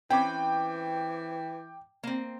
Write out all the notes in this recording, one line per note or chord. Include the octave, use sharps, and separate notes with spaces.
E3 C4 C#4 B4 G5 D6
A#3 C4